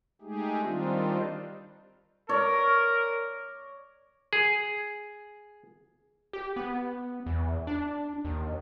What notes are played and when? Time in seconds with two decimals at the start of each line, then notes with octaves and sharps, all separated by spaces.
0.22 G#3 A3 D#4 G4 G#4
0.61 D#3 G3 C4 D4 D#4 F4
2.29 A#4 C#5 D5
4.33 G#4
6.33 G4
6.56 B3
7.26 E2
7.67 D4
8.25 D#2